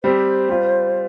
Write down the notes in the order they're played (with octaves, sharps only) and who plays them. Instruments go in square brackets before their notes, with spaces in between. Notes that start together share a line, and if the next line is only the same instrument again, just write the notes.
[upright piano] G3 C4 G4 [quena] C5
[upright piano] G3 F4